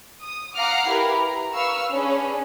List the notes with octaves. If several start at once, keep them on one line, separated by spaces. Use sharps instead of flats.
D#6
F5 F#5 A#5 D6 F6 C7
E4 G4 A#4 B4
A#5
B4 F5 C#6 E6 F6
C#4 D4 G#4 B4